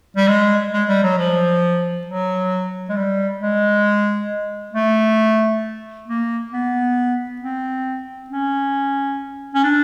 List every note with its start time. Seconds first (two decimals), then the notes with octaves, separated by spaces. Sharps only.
0.17 G3
0.28 G#3
0.73 G#3
0.89 G3
1.03 F#3
1.18 F3
2.07 F#3
2.89 G#3
2.96 G3
3.41 G#3
4.74 A3
6.08 A#3
6.52 B3
7.41 C4
8.30 C#4
9.54 C#4
9.64 D4